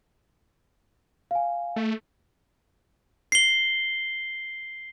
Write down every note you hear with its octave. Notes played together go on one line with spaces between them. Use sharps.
F5 G#5
A3
C7 G7